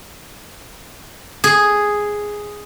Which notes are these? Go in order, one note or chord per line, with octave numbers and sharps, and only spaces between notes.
G#4